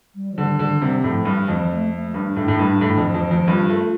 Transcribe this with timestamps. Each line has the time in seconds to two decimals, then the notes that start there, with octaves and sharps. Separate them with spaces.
0.15 G3
0.32 F3
0.38 D3 G3
0.59 D3 G3
0.81 C3 G3
1.04 A2 F3
1.25 G2 G3
1.48 F2 G3
1.70 A3
1.92 A3
2.14 G2 D4
2.36 A2
2.48 A2
2.59 G2
2.81 A2
2.97 F2
3.14 F2
3.31 F2
3.48 G2 F4
3.70 A3